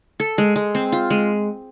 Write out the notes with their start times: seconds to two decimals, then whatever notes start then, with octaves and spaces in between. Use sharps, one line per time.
0.20 A4
0.38 G#3
0.56 G#3
0.75 C4
0.92 F4
1.10 G#3